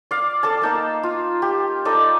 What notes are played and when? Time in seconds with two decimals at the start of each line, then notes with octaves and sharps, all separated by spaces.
0.11 D5 F5
0.43 A4 D5 A5
0.62 A#3 D#4 A5
1.03 F4
1.42 G4
1.85 D#4 A4 D5 D#5